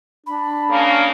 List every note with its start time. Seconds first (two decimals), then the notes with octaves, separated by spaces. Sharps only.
0.27 D4 B5
0.70 C#3 A#3 C#4